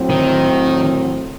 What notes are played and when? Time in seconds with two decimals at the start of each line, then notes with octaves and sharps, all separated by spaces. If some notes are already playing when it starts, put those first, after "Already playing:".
Already playing: A2 F#3 C4
0.10 D#3